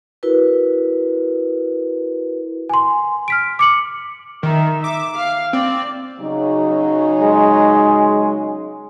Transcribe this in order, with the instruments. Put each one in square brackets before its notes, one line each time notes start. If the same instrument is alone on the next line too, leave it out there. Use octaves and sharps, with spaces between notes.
[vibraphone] E4 F#4 A#4 B4
[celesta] G#5 C6
F6 B6 D7
D6 C#7 F#7
[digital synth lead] D#3 [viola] D#4 E5
[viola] E5 [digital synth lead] D6
[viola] F5
[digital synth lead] C4 [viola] D5
[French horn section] C#3 F#3 D#4
[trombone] G#3